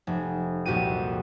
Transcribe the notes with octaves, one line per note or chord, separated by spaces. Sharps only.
F1
C2 F2 A#2 F#4 G4 D#7